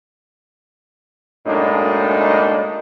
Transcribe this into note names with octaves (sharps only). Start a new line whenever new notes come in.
F#2 A2 G#3 A#3 D4 D#4